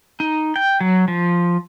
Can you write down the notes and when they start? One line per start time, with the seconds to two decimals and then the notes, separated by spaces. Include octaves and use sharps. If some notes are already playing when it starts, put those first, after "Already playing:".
0.20 D#4
0.56 G5
0.81 F#3
1.08 F3